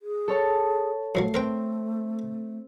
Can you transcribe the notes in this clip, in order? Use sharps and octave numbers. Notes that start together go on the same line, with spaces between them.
G#4
A4 C#5 A5
F#2 F3 F#3 A3 C7
C4 A#4 B4 G5